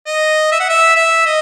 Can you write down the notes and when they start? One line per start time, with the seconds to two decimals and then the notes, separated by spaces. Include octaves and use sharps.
0.07 D#5
0.52 E5
0.60 F#5
0.70 E5
0.96 E5
1.26 D#5